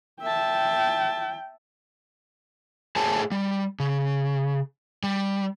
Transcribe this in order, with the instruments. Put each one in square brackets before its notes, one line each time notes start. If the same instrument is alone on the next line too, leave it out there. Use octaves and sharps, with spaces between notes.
[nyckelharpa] E5 A5 [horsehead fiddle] G5
[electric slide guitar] A3 G#4 C5 C#5 G#5 A5
G3
C#3
G3